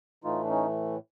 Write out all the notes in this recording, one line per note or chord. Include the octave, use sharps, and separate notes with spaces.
A2 E3 A3 D#4 F4
D4
C#4 D#4